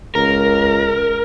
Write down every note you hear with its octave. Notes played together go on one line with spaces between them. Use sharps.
C#2 A#4